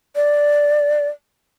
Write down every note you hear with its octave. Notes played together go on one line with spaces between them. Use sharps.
D5